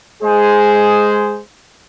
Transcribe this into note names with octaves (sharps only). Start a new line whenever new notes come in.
G#3 G#4 C5